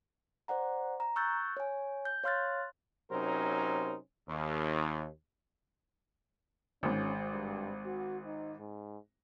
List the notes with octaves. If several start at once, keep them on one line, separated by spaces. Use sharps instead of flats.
C5 D5 F#5 A#5
A#5
C#6 E6 F#6 G6 A6
C#5 G#5
G6
C#5 F5 C6 F6 F#6 A6
C3 F#3 C#4 D#4 A#4 C5
D#2
G#1 G#2 C#4
G2
F#4
D#4
G#2